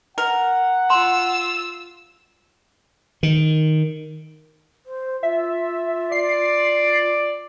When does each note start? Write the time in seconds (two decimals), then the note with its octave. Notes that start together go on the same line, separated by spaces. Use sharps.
0.18 A#4 F#5
0.90 F4 C6 E6
3.23 D#3
4.86 C5
5.23 F4 E5
6.12 D5 C7